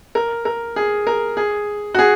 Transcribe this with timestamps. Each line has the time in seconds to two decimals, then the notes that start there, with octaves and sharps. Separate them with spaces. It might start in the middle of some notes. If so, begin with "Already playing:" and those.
0.15 A#4
0.45 A#4
0.76 G#4
1.07 A#4
1.37 G#4
1.94 F#4
1.99 G#4